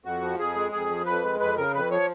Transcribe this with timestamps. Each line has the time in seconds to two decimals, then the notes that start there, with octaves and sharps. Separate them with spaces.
0.05 F2 F#4
0.22 F3
0.39 F2 G#4
0.56 G#3
0.72 F2 G#4
0.90 F3
1.06 F2 B4
1.23 G#3
1.40 F2 B4
1.57 C#3 A#4
1.74 F2 B4
1.91 F3 C#5